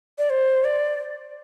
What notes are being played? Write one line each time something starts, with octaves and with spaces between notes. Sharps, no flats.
D5
C5
D5